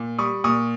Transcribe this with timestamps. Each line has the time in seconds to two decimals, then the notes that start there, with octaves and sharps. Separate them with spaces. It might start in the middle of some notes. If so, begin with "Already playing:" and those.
Already playing: A#2
0.19 G3 C#6 D#6
0.44 A#2 C#6 D#6